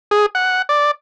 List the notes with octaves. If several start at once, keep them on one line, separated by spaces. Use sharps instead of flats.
G#4
F#5
D5